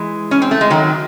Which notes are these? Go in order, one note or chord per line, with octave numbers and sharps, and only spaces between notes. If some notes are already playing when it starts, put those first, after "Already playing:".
Already playing: E3 G#3
C#4
C4
A3
G#3
D#3 F#3